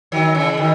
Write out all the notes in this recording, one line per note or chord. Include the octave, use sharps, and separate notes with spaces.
D#3 F#3
C#3 E3
B2 D#3